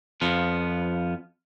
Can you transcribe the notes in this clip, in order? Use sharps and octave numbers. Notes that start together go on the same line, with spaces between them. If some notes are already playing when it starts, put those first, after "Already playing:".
F2 F3 B3